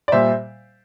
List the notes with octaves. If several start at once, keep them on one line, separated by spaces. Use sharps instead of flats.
D5
A#2 G3 C5 E5